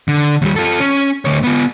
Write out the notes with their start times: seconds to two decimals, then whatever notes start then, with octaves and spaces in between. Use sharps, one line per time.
0.08 D3
0.42 D#2 G3
0.56 F4 A4
0.80 C#4
1.25 D2 C#5
1.43 B3 F4